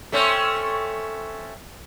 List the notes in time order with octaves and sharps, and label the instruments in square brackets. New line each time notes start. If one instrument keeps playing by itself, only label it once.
[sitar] A3 C4 C#4